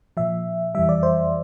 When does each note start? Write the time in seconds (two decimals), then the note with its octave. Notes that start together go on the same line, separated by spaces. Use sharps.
0.17 A#2 F3 E5
0.75 F2 E3 G3 E5
0.89 D5
1.03 C5